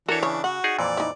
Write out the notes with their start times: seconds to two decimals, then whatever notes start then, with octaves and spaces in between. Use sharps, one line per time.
0.09 E3 D4 F#4 A4 A#4 C#5
0.23 C#3 C#5
0.44 F#4 F#5
0.64 D#4 G#4 D5
0.78 F2 A#2 E3 D5
0.97 D#4 E4